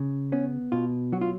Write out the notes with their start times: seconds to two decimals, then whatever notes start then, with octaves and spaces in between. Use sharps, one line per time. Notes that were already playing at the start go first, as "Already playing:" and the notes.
Already playing: C#3
0.32 B3 C#4
0.72 B2 F4
1.12 F#3 F#4
1.21 F4